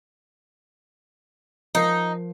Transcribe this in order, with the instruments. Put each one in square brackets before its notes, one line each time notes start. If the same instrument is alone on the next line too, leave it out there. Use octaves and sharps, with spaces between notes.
[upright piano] F3 A#4 C7 [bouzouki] D#4